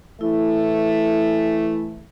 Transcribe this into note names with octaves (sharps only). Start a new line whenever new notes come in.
E3 A3 E4